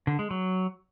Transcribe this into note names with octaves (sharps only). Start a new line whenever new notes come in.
D3
G#3
F#3